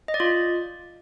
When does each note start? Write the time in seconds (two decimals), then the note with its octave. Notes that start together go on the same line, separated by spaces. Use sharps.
0.08 D#5
0.14 D5
0.20 F4